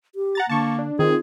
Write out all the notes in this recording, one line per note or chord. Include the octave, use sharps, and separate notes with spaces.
G4
F#5 A#5 A6
D3 A#3 A5 C#6
D4
D#3 C4 F4 G#4